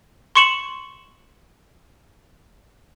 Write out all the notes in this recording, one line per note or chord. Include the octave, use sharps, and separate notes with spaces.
C6 C#6 C#7 E7 F#7